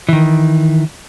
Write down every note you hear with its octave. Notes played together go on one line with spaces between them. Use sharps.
D#3 E3